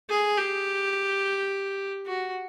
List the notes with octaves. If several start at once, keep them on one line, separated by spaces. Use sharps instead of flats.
G#4
G4
F#4